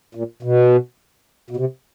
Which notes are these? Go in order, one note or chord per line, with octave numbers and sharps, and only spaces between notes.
A#2
B2
B2
C3